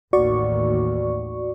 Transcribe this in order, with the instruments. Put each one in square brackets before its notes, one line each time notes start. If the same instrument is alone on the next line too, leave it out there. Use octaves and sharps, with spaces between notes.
[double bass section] A1 D#2 [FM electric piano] F#4 D5 C#6